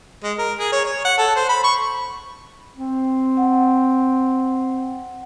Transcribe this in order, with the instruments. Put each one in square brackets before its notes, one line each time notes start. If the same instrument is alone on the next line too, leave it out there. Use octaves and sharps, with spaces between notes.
[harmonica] G#3
A#4
G#4
C#5
C#5
F#5
A4
C5
B5
C#6
[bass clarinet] C4
[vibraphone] F#5